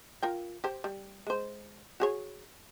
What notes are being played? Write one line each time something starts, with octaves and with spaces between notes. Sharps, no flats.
F4 A#4 G5
G4 C5
G3
G#3 C5
F#4 G#4 C#5